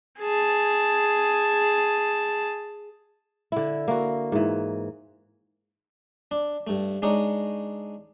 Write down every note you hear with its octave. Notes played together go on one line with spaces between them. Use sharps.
G#4 A5
D3 E4
A#3 F#4
G#2 E3
D4
G2 A3
G#3 D4 D#4 C#5